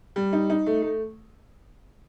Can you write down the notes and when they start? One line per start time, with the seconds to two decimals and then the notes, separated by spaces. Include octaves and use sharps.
0.16 G3
0.33 D#4
0.50 D#4
0.66 A3
0.82 A3